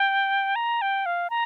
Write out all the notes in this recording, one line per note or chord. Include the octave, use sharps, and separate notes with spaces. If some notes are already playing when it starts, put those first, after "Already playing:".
Already playing: G5
A#5
G5
F5
A#5